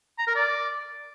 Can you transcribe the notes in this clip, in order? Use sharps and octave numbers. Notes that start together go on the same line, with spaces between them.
A#5
A#4
D5